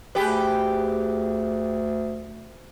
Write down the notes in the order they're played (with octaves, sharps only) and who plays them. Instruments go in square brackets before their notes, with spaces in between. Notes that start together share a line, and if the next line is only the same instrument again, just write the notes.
[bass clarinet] D2 [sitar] G4 G#4 B4